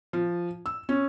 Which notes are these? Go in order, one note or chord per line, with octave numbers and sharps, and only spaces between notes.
F3
E6
C#4